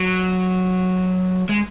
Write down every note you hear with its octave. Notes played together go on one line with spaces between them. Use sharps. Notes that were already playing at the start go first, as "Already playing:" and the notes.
Already playing: F#3
G#3